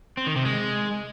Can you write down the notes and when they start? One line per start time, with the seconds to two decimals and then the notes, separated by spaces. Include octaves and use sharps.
0.17 C4
0.27 D#3
0.36 C3
0.45 G#3